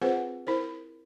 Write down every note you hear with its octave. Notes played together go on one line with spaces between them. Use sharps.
C4 F4 G#4 B4 C5 F#5
E4 A#4 C5